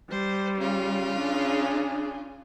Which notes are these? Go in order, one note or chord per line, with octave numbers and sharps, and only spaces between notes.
G3 C5
C#3 F4
D4 G#4